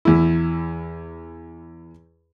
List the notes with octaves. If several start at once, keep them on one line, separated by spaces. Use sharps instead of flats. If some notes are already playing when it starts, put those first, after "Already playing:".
E2 E4